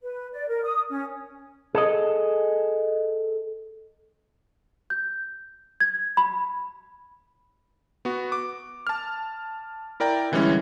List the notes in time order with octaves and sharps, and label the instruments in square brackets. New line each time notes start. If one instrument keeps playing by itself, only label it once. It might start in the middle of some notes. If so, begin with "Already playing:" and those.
[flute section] B4
D5
A#4
D#6
C#4
[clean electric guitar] G#4 A4 D#5
[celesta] G6
G#6
B5
[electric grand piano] B3 F#4
D6
A5 F6
E4 A#4 D5 G5 A#5
D3 E3 G3 G#3 C#4 E4